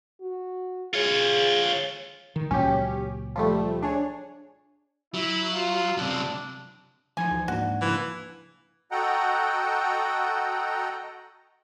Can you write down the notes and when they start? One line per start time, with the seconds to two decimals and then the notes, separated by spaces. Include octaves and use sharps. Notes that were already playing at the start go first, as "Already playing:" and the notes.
0.21 F#4
0.94 F4 G#4 C#5
2.36 D#3
2.51 C#2 A#2 F#3 C#4 G4
3.36 F3 G3 A3
3.83 D4 G#4 C#5
5.14 F#3 E4
5.53 F4
5.97 F#2 C3 D4
7.17 E3 F3 D#4 G#5
7.31 D2
7.48 G#2 A#3 D4 F#4
7.82 A#2 C#3 E3 F3
8.91 F#4 A4 D#5 F#5 G5 A#5